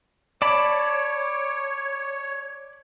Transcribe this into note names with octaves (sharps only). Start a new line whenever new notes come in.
C#5 D5 A5 B5